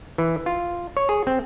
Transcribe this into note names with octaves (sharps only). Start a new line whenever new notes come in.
E3
F4
C#5
G#4
C4